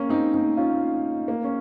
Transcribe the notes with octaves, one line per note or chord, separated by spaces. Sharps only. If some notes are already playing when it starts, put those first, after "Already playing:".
Already playing: A#3 C#4
C4 D#4
C4 D#4
C#4 F4
A#3
C#4